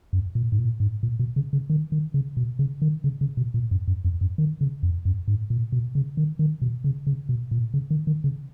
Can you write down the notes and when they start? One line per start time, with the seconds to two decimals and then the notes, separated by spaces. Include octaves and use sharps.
0.13 F#2
0.35 A#2
0.52 G#2
0.58 A#2
0.80 G#2
1.03 A#2
1.19 B2
1.36 C#3
1.53 C#3
1.70 D#3
1.92 D#3
2.14 C#3
2.37 B2
2.59 C#3
2.82 D#3
3.04 C#3
3.21 C#3
3.37 B2
3.54 A#2
3.71 F#2
3.88 F#2
4.05 F2
4.21 F#2
4.38 D#3
4.61 C#3
4.83 F2
5.05 F#2
5.28 G#2
5.50 A#2
5.72 B2
5.95 C#3
6.17 D#3
6.39 D#3
6.62 B2
6.84 C#3
7.07 C#3
7.29 B2
7.51 A#2
7.74 C#3
7.91 D#3
8.07 D#3
8.24 C#3